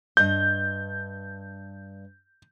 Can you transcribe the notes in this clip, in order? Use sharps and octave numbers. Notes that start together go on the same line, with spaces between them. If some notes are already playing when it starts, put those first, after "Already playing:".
G2 D#5 G6